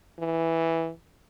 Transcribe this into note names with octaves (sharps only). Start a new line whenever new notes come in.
E3